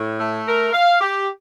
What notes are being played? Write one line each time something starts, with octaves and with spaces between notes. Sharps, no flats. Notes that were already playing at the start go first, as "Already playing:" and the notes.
Already playing: A2
A3
A#4
F5
G4